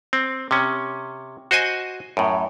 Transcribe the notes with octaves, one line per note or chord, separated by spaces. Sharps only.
C4
C3 C#4
F#4 C5 D#5 G#5
F#2 A2